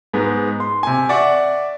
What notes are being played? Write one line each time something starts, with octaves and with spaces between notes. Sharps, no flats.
G#2 G#3 B3
C6
C3 G#5
D5 E5 F#5 C#6